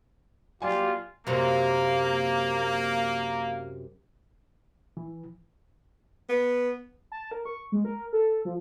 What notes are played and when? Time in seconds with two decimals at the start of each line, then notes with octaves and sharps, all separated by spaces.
0.62 F#3 A#3 F4 G4 D5 G#5
1.27 F#2 C3 A#3
4.97 E3
6.29 B3
7.12 A5
7.31 A#4
7.45 C#6
7.72 G#3
7.85 A#4
8.13 A4
8.45 F3